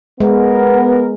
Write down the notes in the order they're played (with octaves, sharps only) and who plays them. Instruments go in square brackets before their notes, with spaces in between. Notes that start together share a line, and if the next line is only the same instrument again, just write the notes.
[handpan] G#3 [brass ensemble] B3 A#4